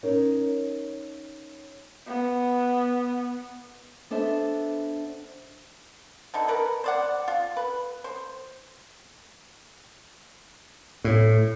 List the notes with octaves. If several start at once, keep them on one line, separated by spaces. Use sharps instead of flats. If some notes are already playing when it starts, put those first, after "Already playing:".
C#4 D#4 A#4
B3
B3 D4 A4 C5 E5
D3 E3 D#4
A#4 B4
C5 D5 F#5
F4
B4
C5
A2